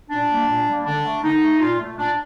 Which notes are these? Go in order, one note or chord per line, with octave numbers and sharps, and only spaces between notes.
A#2 D4
G3 A#3
A#2
G3 A#3
D3 D4
A3
D3 D#4
A3
A#2 F4
A3
A#2 D4